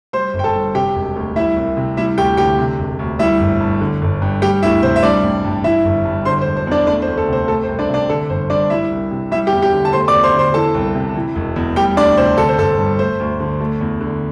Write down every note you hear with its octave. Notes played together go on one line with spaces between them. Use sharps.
G3 C5 C6
G1
G5
A4 A5
G2
C3 G4 G5
E1
D2
G3 E4 E5
C2
C3
G3 E4 E5
D2 G4 G5
D3 G4 G5
C3
E1
D2
G3 E4 E5
G1
G2
D3
G1
G2
G3 G4 G5
D2 E4 E5
C3 C5
E5
G3 D4 D5
A1
G2
E3 E4 E5
G1
G2
D3 C5 C6
C5
E1
C5
E2 D4 D5
A3 D4 D5
C5
D2
A4
C3 C5
A3 A4
C5
C2
D4 D5
C3
D4 D5
D3 A4
G1 C5
G2 D4 D5
G3 E4 E5
C2
C3
G3 E4 E5
G4 G5
E2
G4 G5
D3
A5
A3 C5 C6
D5 D6
E2
C5 C6
D3
C5 C6
E3 A4 A5
C2
C3
E3
E1
E2
G3 G4 G5
D2 D4 D5
C3 C5
D3 A4
C5
G1 A4
G2
A3 C5
D2
D3
A3
E2
D3